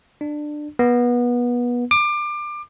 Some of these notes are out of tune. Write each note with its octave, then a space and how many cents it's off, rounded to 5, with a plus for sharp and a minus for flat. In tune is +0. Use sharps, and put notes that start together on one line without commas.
D4 +20
B3 -25
D6 +25